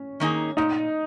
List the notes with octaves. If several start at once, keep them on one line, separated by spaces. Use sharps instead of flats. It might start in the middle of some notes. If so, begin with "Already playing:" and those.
Already playing: C#4 C#5
D#3 A#3 D#4 G#4
A#2 D#4 D#5